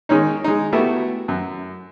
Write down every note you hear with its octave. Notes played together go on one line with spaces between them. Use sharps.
D#3 G#3 C#4 D#4
G#3 D#4
A3 B3 E4 F#4 G4
F#2